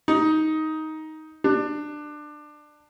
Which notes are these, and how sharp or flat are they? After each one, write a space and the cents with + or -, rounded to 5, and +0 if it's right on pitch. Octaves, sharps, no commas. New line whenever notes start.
D#4 +10
D4 +20